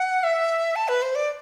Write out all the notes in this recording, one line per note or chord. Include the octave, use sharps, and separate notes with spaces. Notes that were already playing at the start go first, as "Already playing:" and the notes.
Already playing: F#5
E5
A5
B4
C5
D5